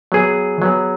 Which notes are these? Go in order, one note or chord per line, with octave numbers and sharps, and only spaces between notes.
F#3 B3 G#4
F#3 B3 G#4